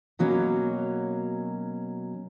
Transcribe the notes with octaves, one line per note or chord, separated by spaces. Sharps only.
B2 F#3 A#3 C#4 F#4